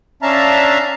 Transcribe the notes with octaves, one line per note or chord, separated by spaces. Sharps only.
C#4 D4 E5 F5 A5 A#5